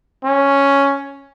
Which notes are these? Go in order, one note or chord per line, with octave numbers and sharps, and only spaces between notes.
C#4